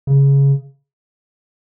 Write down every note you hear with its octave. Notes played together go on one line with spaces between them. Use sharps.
C#3